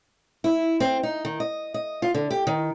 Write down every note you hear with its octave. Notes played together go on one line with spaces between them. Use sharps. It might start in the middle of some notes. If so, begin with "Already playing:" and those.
E4
C4
D#4
D#3
D#5
D#5
F4
D3
G4
D#3